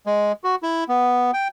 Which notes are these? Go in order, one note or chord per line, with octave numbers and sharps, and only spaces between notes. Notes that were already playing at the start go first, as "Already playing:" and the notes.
G#3
F#4
E4
B3
G5